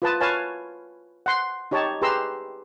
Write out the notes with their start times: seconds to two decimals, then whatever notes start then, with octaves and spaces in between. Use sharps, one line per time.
0.02 F4 B4 A5 D#6
0.21 B4 C#5 F5 G#5 A5
1.26 F#5 C6
1.71 D#4 G4 C#5 D#5 A5
2.02 G4 G#4 B4 A#5 C6 E6